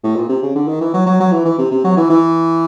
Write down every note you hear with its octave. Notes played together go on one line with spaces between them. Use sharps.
A2
A#2
C3
C#3
D3
D#3
E3
F#3
F#3
F#3
E3
E3
C3
C3
F#3
E3
E3